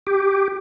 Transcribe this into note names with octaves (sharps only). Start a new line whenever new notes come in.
G4